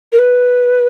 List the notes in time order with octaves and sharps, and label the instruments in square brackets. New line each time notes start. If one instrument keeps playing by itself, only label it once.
[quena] A#4
B4